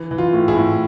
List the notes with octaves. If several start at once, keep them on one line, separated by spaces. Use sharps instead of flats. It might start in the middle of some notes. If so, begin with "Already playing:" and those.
Already playing: E3
E3
F4
A2
E4 G#4
A2